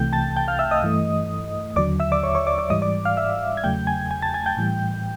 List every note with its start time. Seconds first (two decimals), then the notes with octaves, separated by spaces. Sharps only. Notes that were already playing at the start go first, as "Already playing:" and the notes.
Already playing: C2 C3 E3 A3 G5 G6
0.13 A5 A6
0.37 G5 G6
0.48 F5 F6
0.59 E5 E6
0.71 D#5 D#6
0.83 G2 E3 A3
1.76 D#2 D3 F#3 D5 D6
2.00 E5 E6
2.12 D5 D6
2.23 C#5 C#6
2.35 C#5 C#6
2.47 D5 D6
2.58 D5 D6
2.70 G#2 E3 G3 D#5 D#6
2.82 D5 D6
3.05 F5 F6
3.17 E5 E6
3.57 G#6
3.64 E2 C#3 F#3 A3 G5 G6
3.87 G#5 G#6
4.11 G#5 G#6
4.22 A5 A6
4.34 G#5 G#6
4.46 G5 G6
4.57 A2 E3 G3